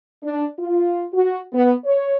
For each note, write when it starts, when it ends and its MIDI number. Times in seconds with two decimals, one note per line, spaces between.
0.22 0.44 62
0.58 1.03 65
1.13 1.39 66
1.52 1.73 59
1.84 2.16 73